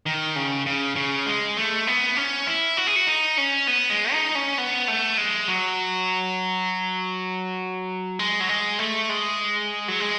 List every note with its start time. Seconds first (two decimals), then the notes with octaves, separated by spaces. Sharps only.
0.06 D#3
0.36 C#3
0.66 C#3
0.96 C#3
1.26 G#3
1.57 A3
1.87 B3
2.17 C#4
2.47 E4
2.77 F#4
2.87 G#4
2.96 F#4
3.07 D#4
3.38 C#4
3.67 B3
3.90 G#3
4.12 D#4
4.35 C#4
4.58 B3
4.88 A3
5.18 G#3
5.48 F#3
8.19 G#3
8.40 F#3
8.49 G#3
8.79 A3
9.09 G#3
9.88 F#3
10.00 G#3